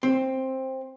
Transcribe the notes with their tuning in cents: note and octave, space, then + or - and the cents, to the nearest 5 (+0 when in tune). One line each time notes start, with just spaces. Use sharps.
C4 +10